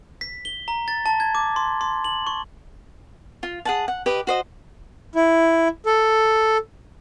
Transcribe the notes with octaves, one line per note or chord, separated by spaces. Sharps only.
B6
G7
A#5
A6
A5
G#6
D6
C6
C6
F#7
C#6
F4
G#4 F#5 A5
F#5
G4 B4 D#5
F#4 C5 D#5
E4
A4